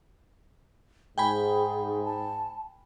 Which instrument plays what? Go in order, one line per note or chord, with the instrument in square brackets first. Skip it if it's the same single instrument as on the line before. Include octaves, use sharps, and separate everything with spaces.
[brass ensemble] G#2 [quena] G#4 [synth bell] G5 G#5 B5
[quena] A5